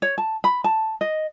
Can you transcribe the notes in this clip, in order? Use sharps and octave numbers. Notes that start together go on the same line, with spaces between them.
C#5
A5
B5
A5
D#5